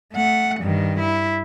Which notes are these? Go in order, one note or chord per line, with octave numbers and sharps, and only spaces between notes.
A3 F#5
G2 D#3
E4